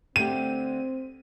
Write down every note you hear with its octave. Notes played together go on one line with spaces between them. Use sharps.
D3 A3 C4 G4 D#7